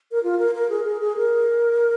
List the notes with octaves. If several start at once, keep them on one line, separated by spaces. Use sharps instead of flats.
A#4
F4
A#4
A#4
G#4
G#4
G#4
A#4